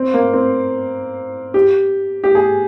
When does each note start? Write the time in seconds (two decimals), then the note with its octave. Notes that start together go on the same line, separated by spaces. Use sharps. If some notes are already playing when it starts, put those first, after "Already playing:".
Already playing: C4
0.14 A#3
0.33 C4
1.54 G4
2.24 G4
2.35 G#4